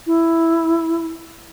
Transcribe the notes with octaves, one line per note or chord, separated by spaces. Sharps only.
E4